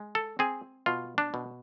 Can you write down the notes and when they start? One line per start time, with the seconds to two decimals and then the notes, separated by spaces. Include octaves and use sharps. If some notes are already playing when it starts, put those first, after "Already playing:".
Already playing: G#3
0.15 A4
0.39 C4 G#4
0.86 B2 F4
1.18 D4
1.34 B2